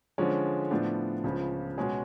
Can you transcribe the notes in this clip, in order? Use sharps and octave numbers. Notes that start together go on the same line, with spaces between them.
D3 F3 G#3 C#4
A2 F3 B3 D4
C#2 C#3 F3
B2 G#3 C#4 G#4